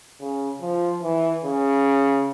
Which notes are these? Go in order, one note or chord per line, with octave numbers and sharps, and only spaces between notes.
C#3
F3
E3
C#3